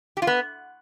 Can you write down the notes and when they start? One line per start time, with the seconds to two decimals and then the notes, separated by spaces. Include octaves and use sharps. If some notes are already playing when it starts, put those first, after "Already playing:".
0.17 G4
0.22 F4
0.27 B3